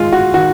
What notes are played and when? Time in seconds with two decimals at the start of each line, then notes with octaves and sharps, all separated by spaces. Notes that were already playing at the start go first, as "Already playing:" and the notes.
Already playing: D#3 G#3 F4
0.12 F#4
0.34 D#3 F#4